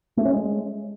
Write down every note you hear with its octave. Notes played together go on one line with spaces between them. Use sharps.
A3
C#4
G#3